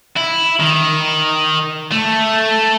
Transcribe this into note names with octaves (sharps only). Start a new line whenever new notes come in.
E4
D#3
A3